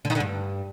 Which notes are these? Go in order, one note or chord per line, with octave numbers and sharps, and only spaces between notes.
D3
D#3
D3
G2